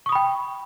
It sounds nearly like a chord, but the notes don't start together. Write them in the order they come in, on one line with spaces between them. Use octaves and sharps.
C#6 D#6 B5 G5